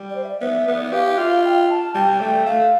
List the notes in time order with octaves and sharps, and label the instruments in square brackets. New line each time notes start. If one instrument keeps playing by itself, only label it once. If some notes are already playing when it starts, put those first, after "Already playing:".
Already playing: [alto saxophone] G3
[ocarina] D5
C5
E5
D5
[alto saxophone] B3 [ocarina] E5
[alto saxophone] B3
[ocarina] D5
E5
[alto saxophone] G4 [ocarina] F5
[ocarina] E5
F5
[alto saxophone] F4 [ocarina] E5
[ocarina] F5
G5
A5
[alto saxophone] G3 [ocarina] G5
[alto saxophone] A3 [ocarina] G5
[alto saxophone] A3 [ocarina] F5